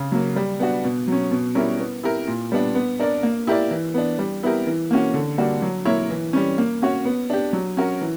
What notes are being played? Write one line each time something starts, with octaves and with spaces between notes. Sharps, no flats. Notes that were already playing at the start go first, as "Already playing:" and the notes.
Already playing: C#3
F#3 A#3
G3
B3 D4 F#4
B2
F#3 C#4
B2
G3 C#4 E4 A#4
B3
E4 G4 A#4
A#2
G3 B3 D4
B3
D4 A#4 D5
A#3
E4 G4 A#4 D5
E3
B3 D4
G3
B3 E4 G4 A#4
E3
A#3 C#4 F#4
D3
G3 A#3 D4 F#4
F#3
A#3 E4 A#4 C#5
E3
G3 C#4
A#3
C#4 F#4 C#5
B3
D4 G4
F#3
C#4 F#4 A#4
E3